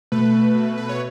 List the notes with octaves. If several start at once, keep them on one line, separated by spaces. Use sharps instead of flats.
B2 A3 B4
B2 A3
B4
C#5